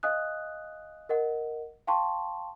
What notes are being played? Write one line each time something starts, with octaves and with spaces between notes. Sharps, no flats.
D#5 F5 G#5 D#6 F#6
A#4 D#5 F#5
F5 G5 A5 C6 C#6